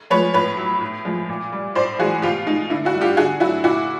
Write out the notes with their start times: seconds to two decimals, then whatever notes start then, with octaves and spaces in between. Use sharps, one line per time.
0.10 F3 G#3 B4 C#5
0.34 A2 B4 C#5
0.57 F#3
0.81 A2
1.05 F3 G#3
1.29 A#2
1.52 G3
1.75 A2 C5 D5
1.99 E3 G#3 F#4 G#4
2.22 B2 F4 G4
2.46 G#3 D#4
2.70 D3 E4
2.85 E4 F#4
2.94 G3
3.01 F4 G4
3.17 D3 F#4 G#4
3.40 F#3 E4 F#4
3.64 A#2 E4 F#4